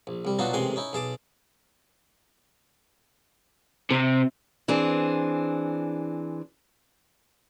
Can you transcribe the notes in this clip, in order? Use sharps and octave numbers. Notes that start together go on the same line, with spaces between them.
A#1
C2 G3
B2 F#3 D4 D#4 F4 F#4
A1 C3 D#3 G#3 G#5 C6
C#4 D#4 E4
B1 G#4 A5 D6
C3
E3 C4 D4 G#4